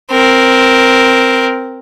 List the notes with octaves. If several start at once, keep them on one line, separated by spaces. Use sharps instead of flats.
C4 A#4